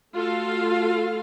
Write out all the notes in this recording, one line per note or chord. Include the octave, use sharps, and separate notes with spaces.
A3 F4 F#4 A4 F5